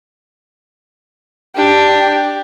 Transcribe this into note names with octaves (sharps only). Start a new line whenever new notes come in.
D4 G4